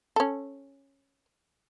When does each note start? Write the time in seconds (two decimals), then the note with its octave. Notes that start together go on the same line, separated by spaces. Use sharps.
0.16 C#4 A4